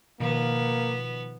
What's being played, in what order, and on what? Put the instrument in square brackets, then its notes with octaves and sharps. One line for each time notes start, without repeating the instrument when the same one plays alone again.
[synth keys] B2 D#3 F3 [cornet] A#3 [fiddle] B3